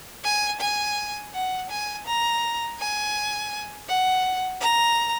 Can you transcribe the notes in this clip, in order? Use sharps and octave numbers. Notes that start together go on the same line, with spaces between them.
G#5
G#5
F#5
G#5
A#5
G#5
F#5
A#5